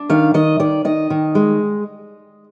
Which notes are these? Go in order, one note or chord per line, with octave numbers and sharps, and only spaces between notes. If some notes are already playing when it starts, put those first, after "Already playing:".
Already playing: D4
D#3 F5
D#3 D#5
D#3 D5
D#3 D#5
D#3
G#3